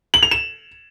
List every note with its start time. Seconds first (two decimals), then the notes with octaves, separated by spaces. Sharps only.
0.14 F#7
0.23 F7
0.31 E7